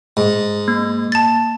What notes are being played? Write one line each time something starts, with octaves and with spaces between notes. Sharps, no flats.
G#2
A#3
A5 A6